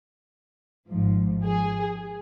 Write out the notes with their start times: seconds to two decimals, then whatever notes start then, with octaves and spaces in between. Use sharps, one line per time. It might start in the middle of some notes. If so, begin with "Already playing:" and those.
0.89 G#1 G#2 F3
1.45 G#4